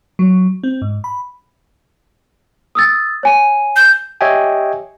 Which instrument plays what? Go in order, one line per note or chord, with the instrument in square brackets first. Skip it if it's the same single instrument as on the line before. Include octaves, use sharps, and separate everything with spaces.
[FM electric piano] F#3
C4
G#2
B5
[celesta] D#6 E6 A6
C#5 G#5 D#7
[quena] G6
[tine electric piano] G4 C#5 D#5 E5 G5 G#5